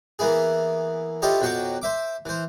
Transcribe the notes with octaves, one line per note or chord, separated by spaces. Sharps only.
E3 A#3 B3 E4 G#4
E4 F4 G4 A4 C#5 D#5
F2 B2 F#3 G5 C#6 D6
C5 E5 D6
E3 C5